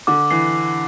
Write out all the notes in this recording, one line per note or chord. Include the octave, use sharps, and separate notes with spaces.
D3 D6
E3 C7